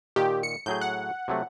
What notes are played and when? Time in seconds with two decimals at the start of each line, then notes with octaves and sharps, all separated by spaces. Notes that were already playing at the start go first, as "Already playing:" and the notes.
0.16 A#2 D#3 G4
0.43 C#7
0.66 A2 F#3 G#4 G6
0.81 F#5
1.28 C3 F#3 A3